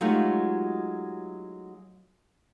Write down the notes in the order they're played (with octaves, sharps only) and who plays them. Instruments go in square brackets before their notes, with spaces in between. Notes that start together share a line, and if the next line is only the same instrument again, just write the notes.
[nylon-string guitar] F#3 G#3 A3 D#4 F4 G4